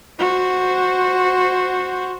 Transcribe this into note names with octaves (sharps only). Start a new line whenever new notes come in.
F#4 C5